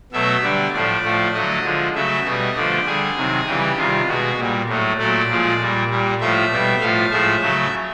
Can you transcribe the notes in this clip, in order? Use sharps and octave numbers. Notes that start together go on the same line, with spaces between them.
B2 F#3 A3 E5
D3 G3 D5
A2 F3 A3 D5
A2 F3 A3
D3 F#3 A3 D#5
D3 F3 G#3
C#3 F#3 A3 E5
B2 G3 D#5
D3 F3 A3 D5
D3 G3 G#4
C3 D#3 F#3
C#3 E3 G3 G4
C3 D#3 G3 F4
B2 G#3 F#4
A#2 G3
A2 F#3 A3
A#2 F#3 A3 D5
A#2 F3 G#3
A#2 G3
A#2 G3
A2 F3 A3 E5
B2 G3
A2 F3 A3 F5
A2 F3 G#3 E5
C#3 F#3 A3